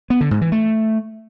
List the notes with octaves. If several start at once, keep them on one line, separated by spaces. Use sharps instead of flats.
B3
D3
G#2
E3
A3